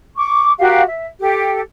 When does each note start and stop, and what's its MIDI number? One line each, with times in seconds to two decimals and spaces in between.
0.16 0.52 85
0.16 0.52 86
0.58 0.81 66
0.58 0.81 67
0.58 0.81 70
0.58 0.81 77
0.87 1.06 76
1.19 1.59 67
1.19 1.59 69